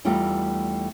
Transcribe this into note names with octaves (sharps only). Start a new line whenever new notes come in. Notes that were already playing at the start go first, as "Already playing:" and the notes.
E2 G3 A3 D#4 F4 G5